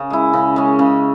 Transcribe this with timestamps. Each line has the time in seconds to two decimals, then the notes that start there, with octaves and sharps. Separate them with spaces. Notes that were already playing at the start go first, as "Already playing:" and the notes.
Already playing: C#3
0.10 G#3 E4
0.33 C#3
0.56 G#3 C#4
0.79 C#3